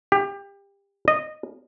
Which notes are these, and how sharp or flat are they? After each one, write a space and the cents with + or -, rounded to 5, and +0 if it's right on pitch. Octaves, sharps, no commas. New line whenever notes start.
G4 +25
D#5 -15